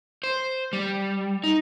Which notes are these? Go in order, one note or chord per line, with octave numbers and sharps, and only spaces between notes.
C5
G3
D#4